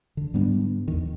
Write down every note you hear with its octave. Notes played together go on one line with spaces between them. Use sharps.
D3
G#2 G3 B3 D4
E2 D#3